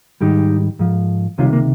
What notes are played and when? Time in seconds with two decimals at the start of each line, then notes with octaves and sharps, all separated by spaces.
0.21 G#2 D#3 G3 D#4 G4
0.79 G#2 F3
1.38 C#2 C3 D#3 G3 C#4 F4
1.53 A#3